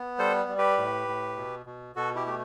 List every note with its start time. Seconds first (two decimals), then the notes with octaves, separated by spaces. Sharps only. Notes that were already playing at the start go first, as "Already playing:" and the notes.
Already playing: B3
0.19 G3 A4 C5
0.48 G3
0.59 G4 B4
0.78 A2
1.08 A2
1.37 B2
1.66 B2
1.95 B2 F#4 A4
2.15 E4 G4
2.26 A3 G4